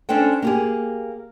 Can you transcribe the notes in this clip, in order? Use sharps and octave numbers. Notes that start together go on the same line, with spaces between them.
C#4 D4 A4 C5 G5
A#3 G4 G#4